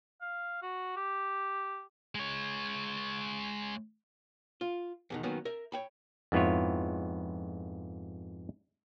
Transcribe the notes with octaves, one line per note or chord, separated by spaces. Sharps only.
F5
F#4
G4
G#3 C#5
F4
E2 B2 D#3
D#3 F#3 A#3 B3 C#4
A#4 E5
C#5 G5 B5
F2 G#2 B3 E4 F4 C#5